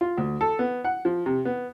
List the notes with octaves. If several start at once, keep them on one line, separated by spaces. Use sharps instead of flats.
F4
D2
A4
B3
F#5
F3
C3
B3